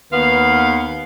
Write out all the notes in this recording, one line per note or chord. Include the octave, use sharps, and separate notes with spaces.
D#2 B3 B4 F5